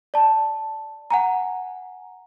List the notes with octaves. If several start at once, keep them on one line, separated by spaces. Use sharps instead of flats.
D5 A5
F#5 G#5 A#5